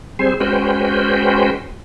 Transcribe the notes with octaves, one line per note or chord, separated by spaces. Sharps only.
G3 C4 G#4 C5
G#3 C#4 F#4 B4 C5 G5